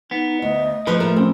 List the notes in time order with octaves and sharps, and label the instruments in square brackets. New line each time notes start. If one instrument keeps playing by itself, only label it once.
[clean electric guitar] B3 [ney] D#4
[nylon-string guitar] D2 [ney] D#5
[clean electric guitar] A2 F3 [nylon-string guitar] B4
[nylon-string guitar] A3 A#4
[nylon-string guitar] C4 [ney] C#4